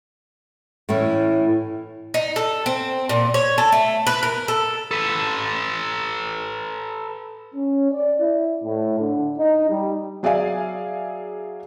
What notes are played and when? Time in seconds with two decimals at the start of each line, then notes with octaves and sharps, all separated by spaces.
0.89 A2 E3 A3 C#4
2.14 D#4
2.36 A4
2.66 C4
3.09 A#2
3.34 C#5
3.58 A4
3.72 A3
4.07 B4
4.23 A#4
4.48 A4
4.91 A4 B4
7.55 C#4
7.92 D5
8.21 E4
8.64 A2
8.99 D3
9.38 D#4
9.69 G3
10.23 F#3 G#4 D5 E5 F5 G#5